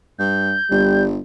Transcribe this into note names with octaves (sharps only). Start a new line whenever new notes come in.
G2 G6
G1 G3